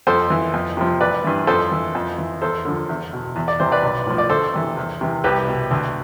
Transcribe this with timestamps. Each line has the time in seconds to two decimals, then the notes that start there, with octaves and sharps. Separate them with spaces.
0.07 F2 A4 C5
0.30 E3
0.54 F2
0.77 C3 F3
1.01 A1 B4 D5
1.24 G2 E3
1.47 F2 A4 C5
1.72 E3
1.95 F2
2.18 E3
2.42 E2 A4 C5
2.65 D3 F3
2.89 E2
3.13 B2
3.36 E2
3.48 D5
3.60 C3 E3 C5
3.72 B4 D5
3.83 B1
4.07 A2 F3
4.18 D5
4.30 D2 A4 C5
4.54 C3 E3
4.77 E2
5.01 C3 E3
5.24 C2 G4 B4
5.47 B2
5.71 D2